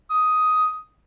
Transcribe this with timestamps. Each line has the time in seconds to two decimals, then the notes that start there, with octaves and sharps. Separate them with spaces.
0.10 D#6